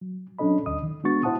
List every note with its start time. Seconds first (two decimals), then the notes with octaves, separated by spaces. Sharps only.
0.01 F#3
0.39 F#3 C#4 D4 A4 D#5 B5
0.66 D2 D#5 D#6
0.83 D#3
1.04 G#3 B3 D4 F#4 C#6 A6
1.23 E4 C5 F#5 A5 D#6